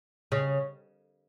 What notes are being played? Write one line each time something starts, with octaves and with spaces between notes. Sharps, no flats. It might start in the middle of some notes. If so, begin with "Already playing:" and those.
C#3